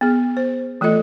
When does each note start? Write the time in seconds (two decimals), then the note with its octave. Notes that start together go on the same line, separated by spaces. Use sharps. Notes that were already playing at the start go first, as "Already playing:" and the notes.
0.01 B3 G#4
0.37 C5
0.81 E3 A3 F4 A4 D#5